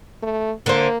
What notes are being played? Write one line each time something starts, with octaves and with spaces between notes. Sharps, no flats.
A3
D3 A#3 C5